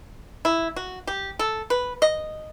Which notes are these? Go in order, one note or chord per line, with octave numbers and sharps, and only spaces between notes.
E4
F#4
G4
A4
B4
D#5